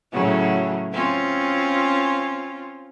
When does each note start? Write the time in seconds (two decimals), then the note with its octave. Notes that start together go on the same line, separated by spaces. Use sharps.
0.12 A2 C#3 F#3
0.92 C4 C#4 F4